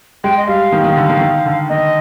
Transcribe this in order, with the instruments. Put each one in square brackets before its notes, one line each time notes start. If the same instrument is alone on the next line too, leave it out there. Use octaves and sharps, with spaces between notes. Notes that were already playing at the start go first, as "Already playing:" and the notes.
[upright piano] G#3 [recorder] G5
[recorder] D#5
[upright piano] G3 [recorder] F5
[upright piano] D#3
D#3
D3
D#3
D#3
D3
[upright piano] D#3 [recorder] D#5